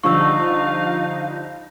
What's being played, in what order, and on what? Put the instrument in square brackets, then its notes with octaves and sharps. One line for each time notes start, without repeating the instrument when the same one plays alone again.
[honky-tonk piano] D3 F3 G3 [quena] D#4 [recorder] F5 [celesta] C#6 E6